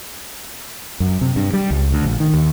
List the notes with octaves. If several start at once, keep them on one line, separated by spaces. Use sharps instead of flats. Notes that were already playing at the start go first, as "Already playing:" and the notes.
F#2
C3
G2
G3
C#2
D2
A#1
D#3
D#2